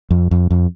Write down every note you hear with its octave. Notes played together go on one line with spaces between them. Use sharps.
F2
F2
F2